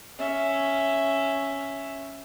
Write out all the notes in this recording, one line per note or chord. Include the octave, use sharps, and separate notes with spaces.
C#4 E5